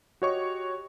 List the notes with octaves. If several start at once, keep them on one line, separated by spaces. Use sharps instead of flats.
F#4 G4 C#5 D#5 C#6